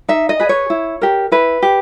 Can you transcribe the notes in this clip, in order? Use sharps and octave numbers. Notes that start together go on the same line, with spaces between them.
D#4 E5
D#5
G#4 B4
C#5
E4
G4 A#4
E4 B4
G4